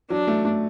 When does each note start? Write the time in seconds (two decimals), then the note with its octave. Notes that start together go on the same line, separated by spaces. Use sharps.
0.10 F#3 D4
0.27 A3
0.45 A3